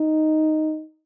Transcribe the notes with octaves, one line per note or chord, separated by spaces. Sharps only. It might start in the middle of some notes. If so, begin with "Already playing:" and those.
Already playing: D#4